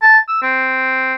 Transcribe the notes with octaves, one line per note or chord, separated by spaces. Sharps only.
A5
E6
C4